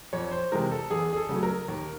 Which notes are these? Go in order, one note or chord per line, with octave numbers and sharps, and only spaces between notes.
F2 C#5
C5
C3 E3 G#3 A#4
A4
E2 G#4
G#4
A4
C#3 F#3 A3
A#4
D#2